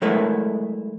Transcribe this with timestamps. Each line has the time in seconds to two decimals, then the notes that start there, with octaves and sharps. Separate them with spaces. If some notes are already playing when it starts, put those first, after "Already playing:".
0.02 F#3 G#3 A3 E4 A#4 B4